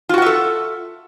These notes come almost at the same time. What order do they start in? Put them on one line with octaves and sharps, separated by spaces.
F4 F#4 F#5 E5 A4